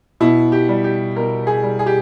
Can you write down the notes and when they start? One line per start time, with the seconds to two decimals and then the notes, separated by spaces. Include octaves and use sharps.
0.20 B2 E4
0.52 G4
0.69 G3
0.84 G4
1.16 B2 A#4
1.47 G#4
1.63 G3
1.79 G#4
1.87 G4